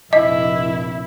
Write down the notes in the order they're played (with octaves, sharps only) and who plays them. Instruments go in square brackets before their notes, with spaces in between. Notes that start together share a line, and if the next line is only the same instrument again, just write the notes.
[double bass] F1 A#1 [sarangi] E4 [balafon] D#5